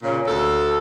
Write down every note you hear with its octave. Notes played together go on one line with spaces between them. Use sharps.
A#2 C#3
D2 A4